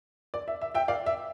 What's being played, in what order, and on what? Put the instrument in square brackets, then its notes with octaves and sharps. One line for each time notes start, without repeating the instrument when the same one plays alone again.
[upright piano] D5
E5
E5
E5 G5
D5 F5
E5